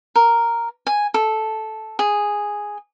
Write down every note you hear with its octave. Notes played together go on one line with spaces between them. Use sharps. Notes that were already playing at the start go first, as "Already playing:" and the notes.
A#4
G#5
A4
G#4